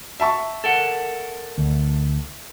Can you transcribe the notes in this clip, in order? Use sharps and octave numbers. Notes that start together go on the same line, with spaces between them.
E5 A5 C#6
A4 A#4 F#5
D2